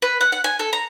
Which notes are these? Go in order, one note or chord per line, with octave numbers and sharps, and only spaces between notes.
B4
F#5
F#5
G#5
A4
A#5